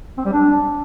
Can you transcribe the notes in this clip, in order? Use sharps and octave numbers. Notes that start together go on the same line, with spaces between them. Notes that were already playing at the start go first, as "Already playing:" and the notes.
C4
G3
D4